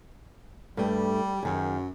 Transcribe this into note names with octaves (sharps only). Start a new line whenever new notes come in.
G2 G3 A3
F#2 D#3 G#4